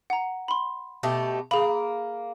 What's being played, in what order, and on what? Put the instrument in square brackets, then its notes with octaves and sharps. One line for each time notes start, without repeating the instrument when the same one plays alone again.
[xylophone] F#5 A#5
B5 C6
[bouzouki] B2 A3 G4
[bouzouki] A#3 [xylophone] G#4 B5